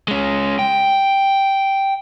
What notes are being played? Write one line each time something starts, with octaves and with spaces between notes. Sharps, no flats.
G#3 C#4
G5